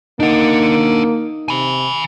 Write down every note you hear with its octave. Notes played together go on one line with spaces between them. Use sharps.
A#3 D4 D#4 F#5
C3 G#5 B5